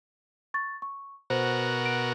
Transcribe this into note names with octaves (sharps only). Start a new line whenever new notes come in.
C#6 A6
C#6
B2 F#4 A#4 C5
D7